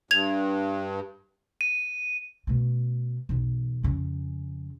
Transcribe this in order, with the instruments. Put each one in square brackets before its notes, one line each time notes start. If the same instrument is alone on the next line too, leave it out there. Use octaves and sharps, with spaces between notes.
[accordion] G2 [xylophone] G#6 F7
[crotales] D#7
[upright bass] B2 A3
B1 E2
F2 C#3